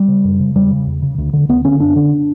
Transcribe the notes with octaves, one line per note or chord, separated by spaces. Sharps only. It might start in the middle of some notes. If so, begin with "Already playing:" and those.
Already playing: G3
C#3
F#2
C#3
E2 G3
C#3
E2
C#3
D2
D3
D2 B3
D3 C#4
F#2 D4
D3